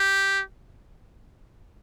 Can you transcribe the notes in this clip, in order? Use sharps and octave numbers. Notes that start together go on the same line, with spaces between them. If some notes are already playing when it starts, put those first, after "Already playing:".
Already playing: G4